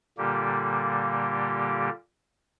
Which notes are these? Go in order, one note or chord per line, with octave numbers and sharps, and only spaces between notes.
A#2 D3 G3 A#3 G4